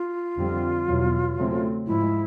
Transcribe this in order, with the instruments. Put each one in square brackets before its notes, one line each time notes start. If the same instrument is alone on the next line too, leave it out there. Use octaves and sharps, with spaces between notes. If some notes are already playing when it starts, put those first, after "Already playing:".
Already playing: [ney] F4
[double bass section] F2 D3 G3 C4
E2 B2 F#3
C#3 F#3 A3 C4
[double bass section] G#2 F3 G#3 [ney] E4